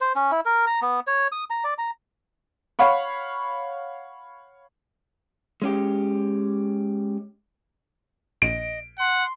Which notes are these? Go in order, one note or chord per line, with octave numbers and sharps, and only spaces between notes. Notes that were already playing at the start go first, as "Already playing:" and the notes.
C5
C#4
E4
A#4
A#5
B3
C#5
D#6
A#5
D5
A#5
C#5 F5 F#5 B5 C#6
G#3 C#4 G4
A#1 D#5 D7
F#5 C6